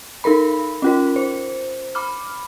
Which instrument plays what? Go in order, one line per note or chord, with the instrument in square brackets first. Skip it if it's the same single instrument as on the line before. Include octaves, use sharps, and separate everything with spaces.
[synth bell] D#4 A4 A#4 B5
C#4 F4 A#4
C5
B5 D6 F6